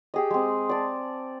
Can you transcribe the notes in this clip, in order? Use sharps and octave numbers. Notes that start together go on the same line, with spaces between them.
G4 G#4 D#5
G#3 C4
D5 A5